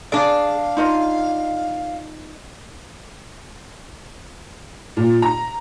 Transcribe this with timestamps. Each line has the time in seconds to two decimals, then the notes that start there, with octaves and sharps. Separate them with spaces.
0.12 D4 G#4 D5 F5
0.77 D#4 F4 D#5
4.97 A#2
5.22 A#5